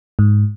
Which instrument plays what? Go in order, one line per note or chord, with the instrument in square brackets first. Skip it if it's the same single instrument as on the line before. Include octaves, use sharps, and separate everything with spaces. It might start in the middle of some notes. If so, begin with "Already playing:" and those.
[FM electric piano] G#2